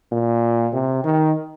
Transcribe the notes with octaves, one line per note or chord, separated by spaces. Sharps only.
A#2
C3
D#3